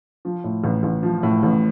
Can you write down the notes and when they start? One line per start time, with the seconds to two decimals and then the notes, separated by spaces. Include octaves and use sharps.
0.25 F3
0.44 A2
0.64 A1
0.83 A1
1.03 F3
1.23 A2
1.43 A1